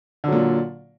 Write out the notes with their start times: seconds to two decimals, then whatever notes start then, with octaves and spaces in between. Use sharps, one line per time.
0.24 D3
0.28 F#3
0.32 A#2